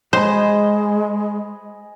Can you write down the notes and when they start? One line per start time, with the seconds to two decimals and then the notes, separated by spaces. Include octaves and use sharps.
0.13 G#3 C5 D#5 G#5 B5